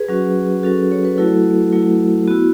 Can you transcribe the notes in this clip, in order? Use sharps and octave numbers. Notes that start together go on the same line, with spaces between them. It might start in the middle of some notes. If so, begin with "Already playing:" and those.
Already playing: G#4 B4
F#3 C#4 F#4
F#3 C#4 F#4 A4
C#5
B4
F#3 A3 E4 F#4 A4
F#3 A3 E4
B3 E4 F#4